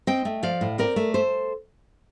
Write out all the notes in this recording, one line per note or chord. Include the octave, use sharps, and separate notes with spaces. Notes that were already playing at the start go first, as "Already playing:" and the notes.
C4 D#5 G5
A3
F3 D5 F5
A2
C4 A#4 D5
A3
A4 C5